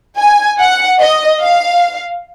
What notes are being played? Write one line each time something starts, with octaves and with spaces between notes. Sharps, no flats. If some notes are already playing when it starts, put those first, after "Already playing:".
G#5
F#5
D#5
F5